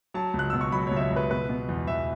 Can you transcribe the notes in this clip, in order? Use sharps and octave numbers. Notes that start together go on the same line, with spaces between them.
F#3 A5
C#2
F#6
B2 E6
C#6
F#3 B5
C#5
C#2
E5
C#5
C#2
B4
B2 B4
B2
E2
E2 E5